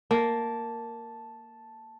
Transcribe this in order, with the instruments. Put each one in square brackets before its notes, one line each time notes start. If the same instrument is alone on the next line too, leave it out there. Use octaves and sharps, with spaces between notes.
[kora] A#3 [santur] A5